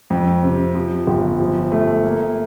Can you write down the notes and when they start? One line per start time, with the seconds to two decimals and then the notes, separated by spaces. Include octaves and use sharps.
0.10 F2
0.43 C3
0.75 F3
1.07 G1
1.40 F3
1.72 A3
2.04 A#3